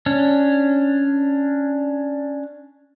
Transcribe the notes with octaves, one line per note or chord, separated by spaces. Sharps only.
C#4 D4